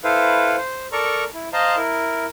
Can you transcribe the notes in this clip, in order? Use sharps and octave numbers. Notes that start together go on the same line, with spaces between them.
E4 A4 B4 C5 F5
C5
A4 A#4 D5 A#5 C#6
E4
C5 D#5 F5 A5 A#5 C6
E4 A#4